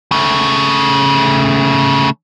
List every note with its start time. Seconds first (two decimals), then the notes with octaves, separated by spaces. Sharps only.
0.12 C#3 A3